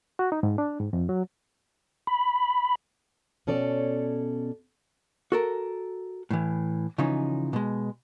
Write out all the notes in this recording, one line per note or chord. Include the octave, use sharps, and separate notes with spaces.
F#4
D#4
G#2
D4
G#2
F2
F#3
B5
B2 C#4 A4 C#5 D5
F#4 A4 A#4
A2 E3
C#3 E3 F3 C#4 D#4
B2 G#3